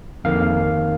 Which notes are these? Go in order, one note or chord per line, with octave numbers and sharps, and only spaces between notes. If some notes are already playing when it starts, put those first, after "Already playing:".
F2 D#3 A#3 F5